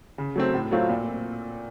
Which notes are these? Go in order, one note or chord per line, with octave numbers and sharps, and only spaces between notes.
C#3
F#3 A3 C4
A2
F#3 A3 C4 F4
A#2